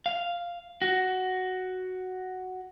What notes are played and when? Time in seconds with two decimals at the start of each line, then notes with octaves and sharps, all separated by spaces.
0.06 F5
0.82 F#4